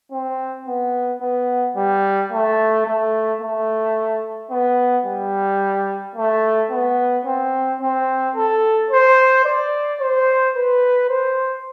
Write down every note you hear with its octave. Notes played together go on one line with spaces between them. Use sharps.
C4
B3
B3
G3
A3
A3
A3
B3
G3
A3
B3
C4
C4
A4
C5
D5
C5
B4
C5